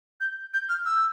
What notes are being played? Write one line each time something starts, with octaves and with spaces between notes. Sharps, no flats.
G6
G6
F6
E6